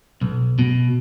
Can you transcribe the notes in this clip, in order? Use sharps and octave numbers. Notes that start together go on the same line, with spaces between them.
B1
B2